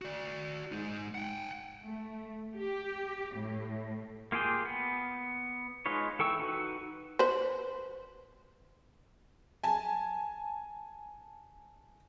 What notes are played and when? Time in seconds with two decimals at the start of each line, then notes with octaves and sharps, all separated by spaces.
0.02 F#4 D5
0.72 G#3 D#4
1.15 F#5 G5
1.85 A3
2.56 G4
3.37 A2
4.32 A#3 F4 G4 G#4 G5
4.65 B3
5.86 G#3 D#4 F4 B4 C#5
6.19 E3 A4 G5 C#6 E6
6.40 D#4 F#4 B4
7.19 B4 C5
9.63 G#5 A5